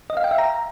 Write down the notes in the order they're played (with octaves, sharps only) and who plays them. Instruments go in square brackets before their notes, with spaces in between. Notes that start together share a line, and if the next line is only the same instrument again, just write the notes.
[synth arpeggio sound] D#5
F5
G5
E5
A#5